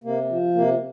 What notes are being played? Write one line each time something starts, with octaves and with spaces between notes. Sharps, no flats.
C3 A#3
F3
C3 A#3